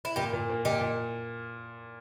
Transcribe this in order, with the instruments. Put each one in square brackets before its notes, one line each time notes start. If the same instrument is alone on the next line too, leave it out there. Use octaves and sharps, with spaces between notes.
[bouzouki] E4
[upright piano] A#2 [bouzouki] D#4 G4
[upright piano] A#2
A#3
[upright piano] A#2 [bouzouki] D#4 G4
[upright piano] A#2